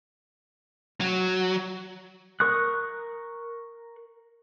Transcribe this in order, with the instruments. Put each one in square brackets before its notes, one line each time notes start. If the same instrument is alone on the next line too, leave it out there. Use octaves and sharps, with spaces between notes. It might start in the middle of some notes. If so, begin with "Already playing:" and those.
[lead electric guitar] F#3
[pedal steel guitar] A#4 C#6 D#6 F#6